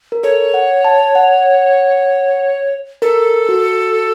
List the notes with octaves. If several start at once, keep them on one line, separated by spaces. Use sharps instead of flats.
A#4
A4 C#5
F#5
A5
F#5
A4 A#4
F#4